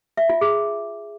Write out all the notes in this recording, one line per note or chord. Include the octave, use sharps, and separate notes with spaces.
E5
F4
G#4